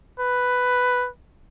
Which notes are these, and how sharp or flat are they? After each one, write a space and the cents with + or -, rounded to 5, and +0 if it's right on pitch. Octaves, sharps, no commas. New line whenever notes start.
B4 +5